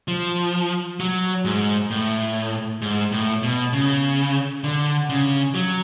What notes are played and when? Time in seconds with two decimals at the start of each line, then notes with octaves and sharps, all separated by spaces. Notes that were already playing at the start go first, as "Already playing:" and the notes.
0.08 F3
1.00 F#3
1.45 G#2
1.90 A2
2.82 G#2
3.12 A2
3.43 B2
3.73 C#3
4.64 D3
5.09 C#3
5.55 F#3